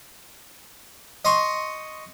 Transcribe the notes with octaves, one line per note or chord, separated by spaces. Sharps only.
D#5 C6 C#6